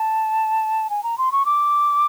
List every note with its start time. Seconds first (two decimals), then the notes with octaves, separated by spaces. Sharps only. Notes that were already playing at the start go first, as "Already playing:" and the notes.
Already playing: A5
0.90 G#5
1.03 A#5
1.18 C6
1.32 C#6
1.46 D6